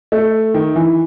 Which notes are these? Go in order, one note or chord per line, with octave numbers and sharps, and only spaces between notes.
A3
D#3
E3